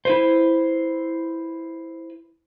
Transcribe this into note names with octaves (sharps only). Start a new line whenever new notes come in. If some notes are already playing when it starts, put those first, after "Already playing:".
E4 B4 C5